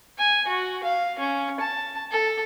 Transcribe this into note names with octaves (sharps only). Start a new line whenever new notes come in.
G#5
F#4
F5
C#4
A5
A4